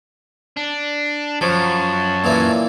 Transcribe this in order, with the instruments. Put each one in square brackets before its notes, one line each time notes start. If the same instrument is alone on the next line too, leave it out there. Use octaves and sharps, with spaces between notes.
[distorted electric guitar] D4
[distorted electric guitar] F#2 [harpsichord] F3 [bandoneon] C#5 A5
[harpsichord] A#2 E3 A#3